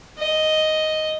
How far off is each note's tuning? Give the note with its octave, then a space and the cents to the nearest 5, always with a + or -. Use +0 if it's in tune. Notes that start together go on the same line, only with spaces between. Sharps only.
D#5 +0